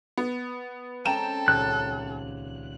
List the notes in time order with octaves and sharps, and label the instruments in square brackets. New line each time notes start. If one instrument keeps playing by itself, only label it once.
[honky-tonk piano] B3
[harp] G#3 C4 C#4 [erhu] A4 [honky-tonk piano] G5 A#5 E7
[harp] D#1 C#2 G6 [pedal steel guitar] F#6